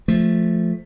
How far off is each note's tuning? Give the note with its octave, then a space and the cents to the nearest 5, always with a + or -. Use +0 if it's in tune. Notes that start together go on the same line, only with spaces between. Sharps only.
F3 +0 A3 +0